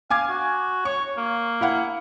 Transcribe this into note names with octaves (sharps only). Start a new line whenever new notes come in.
F5 G#5 D6 G#6
F#4
C#5 C#6
A#3
E4 F5 F#5